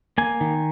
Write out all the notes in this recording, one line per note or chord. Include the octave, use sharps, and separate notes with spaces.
A#3 G#5
D#3